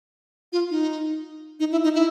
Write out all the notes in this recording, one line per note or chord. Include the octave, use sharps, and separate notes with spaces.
F4
D#4
D#4
E4
D#4
E4